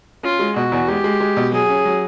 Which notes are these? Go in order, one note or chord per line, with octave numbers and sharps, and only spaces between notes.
C#4 F4
G#3
B2 F#4
E2
G#3 G4
G#3
G#3
B2
F#3 G#4
C#4
F#3